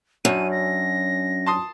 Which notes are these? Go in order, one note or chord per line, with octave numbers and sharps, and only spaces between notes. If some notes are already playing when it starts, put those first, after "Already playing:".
F#2 F#3 C#4 D4 D#7
A#6
A5 C6 D#6